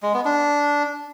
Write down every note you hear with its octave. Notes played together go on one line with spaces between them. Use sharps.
G#3
B3
D4